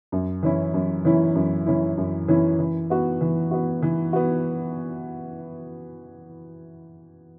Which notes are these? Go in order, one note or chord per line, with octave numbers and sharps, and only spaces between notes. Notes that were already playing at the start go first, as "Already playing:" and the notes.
F#2
E3 C#4 E4
F#2
E3 C#4 E4
F#2
E3 C#4 E4
F#2
E3 C#4 E4
E3
B3 F#4
E3
B3 F#4
E3
B3 F#4